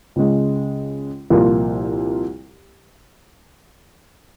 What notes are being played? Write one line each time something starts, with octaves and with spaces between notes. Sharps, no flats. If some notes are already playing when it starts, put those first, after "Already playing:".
C#2 C#3 G#3
C2 A#2 F3 A#3 F4